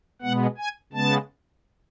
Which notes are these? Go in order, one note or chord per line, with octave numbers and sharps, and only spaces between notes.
B2 G#3 B3 F#5
G#5
C#3 G#3 B3 A5